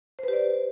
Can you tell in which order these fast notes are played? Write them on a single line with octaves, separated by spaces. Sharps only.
C5 B4 G4 D5